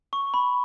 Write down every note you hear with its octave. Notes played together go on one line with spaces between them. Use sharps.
C#6
B5